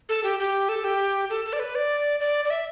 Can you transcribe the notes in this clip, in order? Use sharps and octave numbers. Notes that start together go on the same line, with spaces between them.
A4
G4
G4
A4
G4
A4
A4
D5
B4
D5
D5
D5
E5